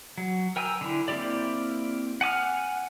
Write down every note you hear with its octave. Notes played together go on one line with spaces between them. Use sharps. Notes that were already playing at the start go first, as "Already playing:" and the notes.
F#3
A#4 G5 G#5 A#5 E6
D3 E4
A#3 C4 E4 G4 D5
F#5 G#5 D6 F6